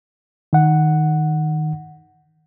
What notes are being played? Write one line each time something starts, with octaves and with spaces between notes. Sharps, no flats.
D#3 F#5